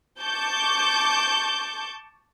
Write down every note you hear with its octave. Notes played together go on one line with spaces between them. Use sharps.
A5 C#6 D6 G6